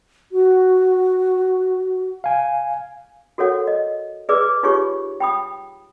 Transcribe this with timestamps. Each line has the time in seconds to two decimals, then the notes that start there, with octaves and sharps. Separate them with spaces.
0.32 F#4
2.24 F5 G#5
3.38 F#4 A4 A#4 C#5 F#5
3.67 D#5
4.29 G#4 B4 D5 D6 E6
4.63 D#4 F4 G4 G#4 C#5 C#6
5.20 G5 B5 D#6